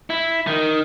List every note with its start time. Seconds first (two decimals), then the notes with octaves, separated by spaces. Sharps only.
0.10 E4
0.47 D#3